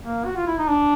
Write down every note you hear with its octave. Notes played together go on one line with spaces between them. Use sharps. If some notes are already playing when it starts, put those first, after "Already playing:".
A#3
F#4
F4
E4
D#4
D4